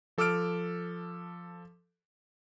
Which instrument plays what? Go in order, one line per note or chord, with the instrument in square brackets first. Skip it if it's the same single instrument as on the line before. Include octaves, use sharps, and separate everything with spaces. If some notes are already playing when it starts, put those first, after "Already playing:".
[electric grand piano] F3 A4 D6 E6 F6 D7